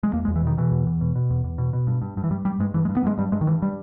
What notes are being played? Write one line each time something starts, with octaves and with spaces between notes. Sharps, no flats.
G#3
E2 A#3
G#3
E2
E3
B2 D#3
B2 E3
E2
E2
B2
B2
E2
E2
B2
B2
G2
G2
G2
E3
G2 G3
G2 G3
G2 G#3
G2 E3
G#3
G2
B3
G2 G#3
G2 G3
G2 G#3
D#3
G2 E3
G3